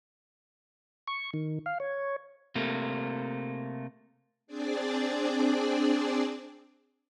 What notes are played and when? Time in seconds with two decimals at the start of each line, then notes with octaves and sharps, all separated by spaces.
1.08 C#6
1.34 D#3
1.66 F5
1.80 C#5
2.55 C3 A3 A#3
4.47 C4 D4 G#4 D5